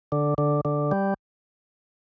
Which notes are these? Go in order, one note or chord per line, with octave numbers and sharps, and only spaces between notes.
D3
D3
D3
G3